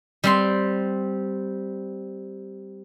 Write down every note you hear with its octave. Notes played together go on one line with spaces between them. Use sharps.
G3 C4 C6